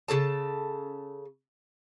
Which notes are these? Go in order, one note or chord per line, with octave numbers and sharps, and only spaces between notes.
C#3 G4 A4 A5